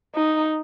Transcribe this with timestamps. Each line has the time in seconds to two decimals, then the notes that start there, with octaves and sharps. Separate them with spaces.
0.16 D#4